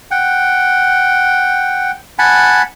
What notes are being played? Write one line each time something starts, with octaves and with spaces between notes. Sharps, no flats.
F#5 G5
F#5 G#5 A5 B5